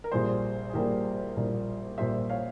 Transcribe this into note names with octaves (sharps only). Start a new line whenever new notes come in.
A#4
A#1 A#2 G3 A#3 G#4 C5
G#4
A#1 A#2 G3 A#3 G4 A#4
A#1 A#2 G3 A#3
A#1 A#2 G3 A#3 C5 E5
C#5 F5